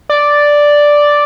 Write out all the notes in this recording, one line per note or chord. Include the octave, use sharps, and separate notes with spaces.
D5